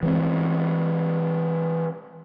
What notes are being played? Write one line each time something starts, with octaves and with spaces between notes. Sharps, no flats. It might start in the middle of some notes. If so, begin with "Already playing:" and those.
E3 G#3 C4